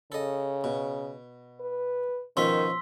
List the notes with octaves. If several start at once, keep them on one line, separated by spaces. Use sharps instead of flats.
C#3 A4 D#5
B2
B4
B2 D#3 F3 C#4 C6 E6 B6